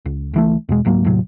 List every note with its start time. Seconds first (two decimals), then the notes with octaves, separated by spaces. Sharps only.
0.05 C#2
0.33 C#2 E3 A3
0.69 E2 B2 G#3
0.85 C#2 G#2 F#3 A#3
1.04 D#2 A2 C3 F#3